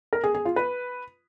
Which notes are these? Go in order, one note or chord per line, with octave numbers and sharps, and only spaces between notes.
A#4
G#4
G#4
F4
B4